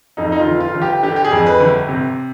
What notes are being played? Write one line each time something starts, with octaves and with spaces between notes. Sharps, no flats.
F2 D#4
D#4
F4
G1
F4
G1
G4
D3 G4
G4
G#4
F2
B4
G1
C3